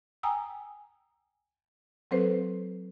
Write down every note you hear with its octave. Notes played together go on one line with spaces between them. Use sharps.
G5 G#5 A#5 D#6 E6
F#3 C4 A4 B4 C5